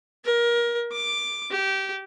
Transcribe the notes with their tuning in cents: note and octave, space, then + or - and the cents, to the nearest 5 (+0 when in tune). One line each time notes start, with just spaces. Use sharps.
A#4 +25
D6 +5
G4 -20